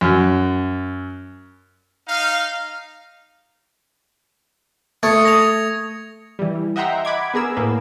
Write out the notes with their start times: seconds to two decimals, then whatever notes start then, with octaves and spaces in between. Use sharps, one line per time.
0.01 F#2
2.08 D#4 F5
5.03 A3 D#6 G#6 C#7
5.25 A#6 F7
6.39 E3 G3
6.76 D#5 E5 F#5 G5 A#5 C6
7.05 F#5 B5 D6 G#6
7.34 B3 G#4 A#4 E6
7.56 A2 A#3 B3